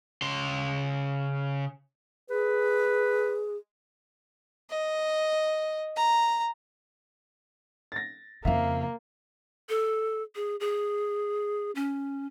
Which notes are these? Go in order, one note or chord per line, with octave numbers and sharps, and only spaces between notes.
C#3 C6
G#4 B4
D#5
A#5
A6 A#6
F2 C#3 A#3 E5 F5
A4
G#4
G#4
C#4